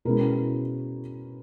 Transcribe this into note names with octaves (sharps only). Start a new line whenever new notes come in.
B2 G#3 C#4 E4 A#4